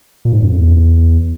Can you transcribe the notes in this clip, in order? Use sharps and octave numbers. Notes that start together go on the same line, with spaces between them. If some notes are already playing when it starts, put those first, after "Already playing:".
A#2
G#2
F#2
F2
E2